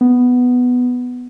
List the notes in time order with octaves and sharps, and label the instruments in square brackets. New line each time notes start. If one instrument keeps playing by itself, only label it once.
[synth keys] B3